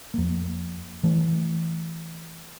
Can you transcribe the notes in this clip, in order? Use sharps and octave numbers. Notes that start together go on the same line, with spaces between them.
F2 A#3
E3 A3